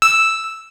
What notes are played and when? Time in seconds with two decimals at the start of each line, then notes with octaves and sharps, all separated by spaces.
0.02 E6